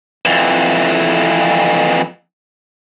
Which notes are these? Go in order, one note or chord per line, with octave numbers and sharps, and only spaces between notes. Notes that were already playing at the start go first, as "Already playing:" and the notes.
F2 E3